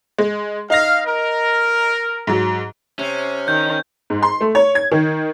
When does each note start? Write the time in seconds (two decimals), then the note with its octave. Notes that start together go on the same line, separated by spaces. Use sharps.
0.18 G#3
0.70 D#4 F5 A#6
1.06 A#4
2.27 G#2 F#3
2.99 C3 C#4
3.48 D#3 G6
4.10 G#2
4.23 C6
4.41 A3
4.55 C#5
4.75 G#6
4.92 D#3